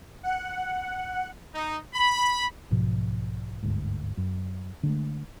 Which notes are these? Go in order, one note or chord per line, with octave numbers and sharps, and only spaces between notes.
F#5
D#4
B5
B1 G#2 B2 F3
G1 D2 G#2
F#2
D3 G#3 A3